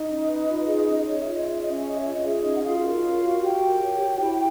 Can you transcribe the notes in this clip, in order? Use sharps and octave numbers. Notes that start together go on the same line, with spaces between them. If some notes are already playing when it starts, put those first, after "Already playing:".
Already playing: D#4 D#5
C#4
B4
F4
G#4
C#4
C#5 D#5
E5
F4
D#5
G#4 E5
D#5
C#4
E5
C#5 D#5
F4 E5
D#5
G#4 E5
C#4 D#4 D#5
F#5
F4 F#4 F5
A#4
C#5
F#4
F#4 G4 G5
A#4
C#5
F#4
E4